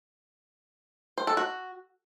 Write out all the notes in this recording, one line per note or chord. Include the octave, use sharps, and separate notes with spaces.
C5
A4
F#4